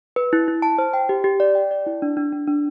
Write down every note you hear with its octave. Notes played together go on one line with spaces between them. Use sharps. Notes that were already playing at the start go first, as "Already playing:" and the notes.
B4
E4
E4
A5
C5
G5
G4
G4
D5
G5
D5
E4
D4
D4
D4
D4